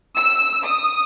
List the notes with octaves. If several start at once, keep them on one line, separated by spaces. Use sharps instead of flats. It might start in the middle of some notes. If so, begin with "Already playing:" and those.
E6
D#6